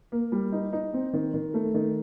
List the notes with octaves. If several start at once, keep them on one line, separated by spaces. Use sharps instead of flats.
A#3
G3
D#4
D#4
C4
D#3
D#3
A3
D#3